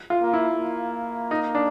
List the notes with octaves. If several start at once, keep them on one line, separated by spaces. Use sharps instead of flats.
F4
A#3
E4
A#3
D#4
D4